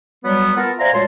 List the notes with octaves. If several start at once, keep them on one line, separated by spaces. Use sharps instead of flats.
F#3 G3 B3
B3 F4 A4 A#4
C5 D5 E5 F5 G#5 A#5
F#2 A#2 G#3 C#5 A5 C6